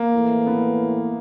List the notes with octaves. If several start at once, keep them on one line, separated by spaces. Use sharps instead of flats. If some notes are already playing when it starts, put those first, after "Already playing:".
Already playing: A#3
A2 E3 A3
B3